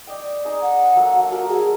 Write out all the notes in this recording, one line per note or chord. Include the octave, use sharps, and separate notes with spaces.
D5 D#5 G5
D#4 G#4 D#5
F#5
F#3 A#3 A4
F#4 A4 A#4 G#5
G#4